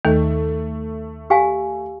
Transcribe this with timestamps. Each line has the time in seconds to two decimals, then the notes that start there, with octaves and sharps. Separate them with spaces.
0.05 D#2 D#3 A3
1.30 G4 F5 G#5